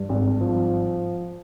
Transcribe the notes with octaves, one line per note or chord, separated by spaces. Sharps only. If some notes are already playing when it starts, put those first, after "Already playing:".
Already playing: G2
G#1
F3